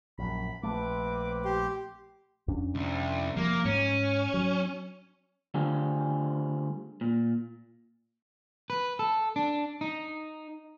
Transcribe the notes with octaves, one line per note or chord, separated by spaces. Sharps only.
A#1 F#2 B5
A#1 A3 C4 B4 D6
G4 C6
F2 C#4 D4
C2
F3 G3 A#3
G#2 C#4
F#3
D3 G3 A3 C4 F4 G#4
A#2
B4
A4
D4
D#4